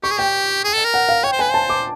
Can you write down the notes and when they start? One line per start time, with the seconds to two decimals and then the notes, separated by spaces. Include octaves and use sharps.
0.03 G4 C#6
0.11 G#4
0.19 G4 G5
0.65 G#4
0.74 A4
0.85 A#4
0.94 F#5
1.09 F5
1.23 C#5 G5
1.32 C5
1.39 B4 G#5
1.51 C5 A5
1.69 D6